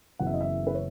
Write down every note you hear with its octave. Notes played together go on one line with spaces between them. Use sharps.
F#1 F#2 E3 B3 F#5
E5
D#5
E5
B4
C#5